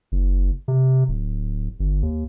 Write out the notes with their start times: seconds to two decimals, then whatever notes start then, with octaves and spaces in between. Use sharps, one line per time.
0.12 F#1
0.68 C3
1.08 D1
1.80 G1
2.02 D#2